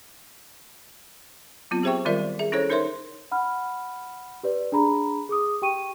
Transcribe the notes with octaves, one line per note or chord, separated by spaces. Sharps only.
F#3 B3 C4 F4
G4 G#4 C5 E5 G5 C#6
D#3 G3 F4 A#4 D5 E5
G#4 E5
C#4 E4 G#4 A4 C5 C#5
D#4 A#4 C5 C#5 E5 C6
F#5 B5 F6
G4 B4 D5
D4 G#4 A#5 B5
G#4 D6 D#6
G4 G5 C#6 D#7